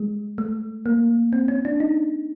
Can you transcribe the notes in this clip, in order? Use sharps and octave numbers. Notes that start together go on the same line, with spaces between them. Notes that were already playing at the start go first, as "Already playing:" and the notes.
Already playing: G#3
A3
A#3
C4
C#4
D4
D#4